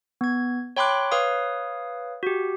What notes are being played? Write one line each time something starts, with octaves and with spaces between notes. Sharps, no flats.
B3 G#6
C#5 G5 B5 C6 D6 F#6
B4 C#5 F5 D#6
F#4 G4